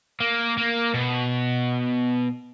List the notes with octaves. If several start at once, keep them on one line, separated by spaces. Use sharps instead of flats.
A#3
A#3
B2